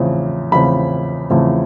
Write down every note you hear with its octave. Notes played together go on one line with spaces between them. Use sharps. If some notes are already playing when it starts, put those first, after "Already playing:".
Already playing: E2 C#3 F3 A3 C4
E2 C#3 F3 A3 C4 B5
E2 C#3 F3 A3 C4